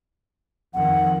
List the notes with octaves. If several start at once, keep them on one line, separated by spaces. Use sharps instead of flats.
F2 D#3 F3 F#5